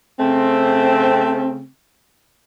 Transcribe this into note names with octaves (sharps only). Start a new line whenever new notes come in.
C#3 A3 C4